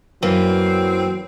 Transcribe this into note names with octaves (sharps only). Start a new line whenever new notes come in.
F#2 E3 F#3 A#3 C4